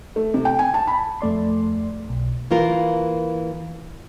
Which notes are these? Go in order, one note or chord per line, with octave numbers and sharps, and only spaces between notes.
A3
C3
G5
G#5
A5
B5
F2 A3 D5 C6
B1
E3 A#3 F4 A#4